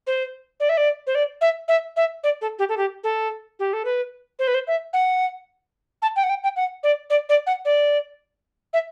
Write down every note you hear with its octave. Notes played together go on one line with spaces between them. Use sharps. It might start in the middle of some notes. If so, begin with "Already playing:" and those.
C5
D5
E5
D5
C5
D5
E5
E5
E5
D5
A4
G4
A4
G4
A4
G4
A4
B4
C5
B4
C5
E5
F#5
A5
G5
F#5
G5
G5
F#5
D5
D5
D5
F#5
D5
E5